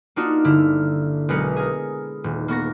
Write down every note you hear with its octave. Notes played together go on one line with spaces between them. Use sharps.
A#3 D4 D#4 F4 F#4
G1 D3 E4 E6 F6
B1 G#3 A#4 B4 C#7
G#4 A#4
D#1
A#3 B3 C#6 A#6